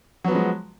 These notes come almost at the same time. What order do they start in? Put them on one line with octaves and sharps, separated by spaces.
F#3 B3 F3 G#3